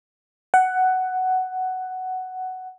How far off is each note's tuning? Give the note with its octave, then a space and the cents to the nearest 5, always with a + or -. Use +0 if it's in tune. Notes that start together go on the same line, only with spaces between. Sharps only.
F#5 +10